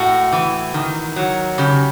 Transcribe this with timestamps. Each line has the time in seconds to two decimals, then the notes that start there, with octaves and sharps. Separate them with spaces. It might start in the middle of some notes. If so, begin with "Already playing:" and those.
Already playing: A2 F#4
0.32 E3
0.74 D#3
1.16 F#3
1.58 C#3 G4